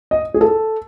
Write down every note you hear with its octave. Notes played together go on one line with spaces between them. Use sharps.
D#5
G#4
A4